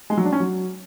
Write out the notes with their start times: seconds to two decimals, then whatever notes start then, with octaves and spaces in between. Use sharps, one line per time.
0.10 G#3
0.17 F#3
0.25 D4
0.33 C#4
0.40 F#3